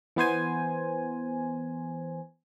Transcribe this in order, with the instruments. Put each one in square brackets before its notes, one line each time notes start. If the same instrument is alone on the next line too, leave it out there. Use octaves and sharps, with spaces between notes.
[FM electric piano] E3 B3 C5 G#5